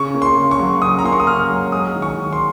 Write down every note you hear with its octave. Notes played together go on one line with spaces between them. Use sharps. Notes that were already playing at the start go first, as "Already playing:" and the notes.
Already playing: C#3 C#6
A#3
C6
C#3
C#6
F#3
C#3 D#6
A#5
A#3 C6
C#6
D#6
C#3 F6
F#3
G#3 D#6
D#3
C#6
D#3
C6